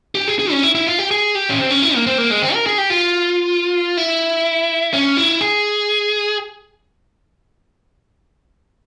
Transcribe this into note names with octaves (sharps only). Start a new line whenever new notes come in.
G4
G#4
G#4
C#4
E4
E4
F4
G4
G#4
G4
C#4
C4
C#4
E4
A#3
C4
A#3
G#3
C4
A#4
G#4
G4
F4
E4
C#4
E4
G#4